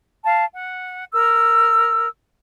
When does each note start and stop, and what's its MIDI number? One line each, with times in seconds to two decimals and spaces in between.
0.25 0.45 77
0.25 0.45 81
0.55 1.03 78
1.13 2.08 70
1.13 2.08 88